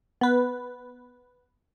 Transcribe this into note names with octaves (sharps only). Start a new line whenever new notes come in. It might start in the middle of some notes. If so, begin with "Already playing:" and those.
B3 B4